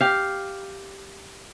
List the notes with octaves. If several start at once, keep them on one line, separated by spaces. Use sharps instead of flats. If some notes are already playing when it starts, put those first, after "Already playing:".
G4 F5